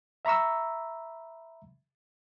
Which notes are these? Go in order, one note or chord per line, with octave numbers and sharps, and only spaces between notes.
E5 A#5 B5 C#6 E6